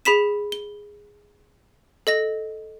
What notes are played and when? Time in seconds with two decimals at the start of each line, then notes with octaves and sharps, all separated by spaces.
0.05 G#4 B5 B6 E7
0.52 G7
2.07 A4 D#5 A#6